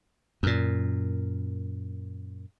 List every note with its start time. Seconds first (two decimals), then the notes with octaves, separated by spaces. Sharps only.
0.43 F#2 A#2